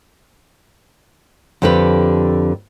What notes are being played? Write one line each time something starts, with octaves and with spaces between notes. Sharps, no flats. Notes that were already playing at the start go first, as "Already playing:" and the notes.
F2 D3 G4 A4 B4